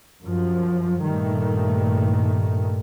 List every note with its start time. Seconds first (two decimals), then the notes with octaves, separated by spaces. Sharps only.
0.23 F#2 F3
1.04 G2 A#2 D#3 A3